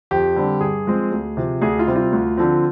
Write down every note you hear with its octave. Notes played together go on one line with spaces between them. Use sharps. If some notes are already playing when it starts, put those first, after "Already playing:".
F2 G4
D3 G3 C4
G2 G#4
F3 G#3 C4
D2
C3 F3
D2 G#4
F4
C3 G3 C4
F4
D2
D3 F3 C4